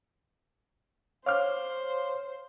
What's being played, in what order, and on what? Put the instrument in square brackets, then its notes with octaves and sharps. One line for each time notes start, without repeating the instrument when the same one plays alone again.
[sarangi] C5 [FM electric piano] C#5 [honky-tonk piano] F5 D6 F6